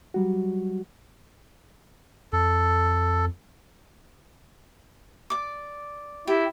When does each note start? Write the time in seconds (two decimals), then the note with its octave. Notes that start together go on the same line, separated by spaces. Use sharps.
0.14 F#3 G3 F#4
2.33 F2 A4
5.30 D5 D6
6.27 E4 G4 D5